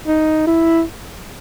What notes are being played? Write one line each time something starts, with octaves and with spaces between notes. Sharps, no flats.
D#4
E4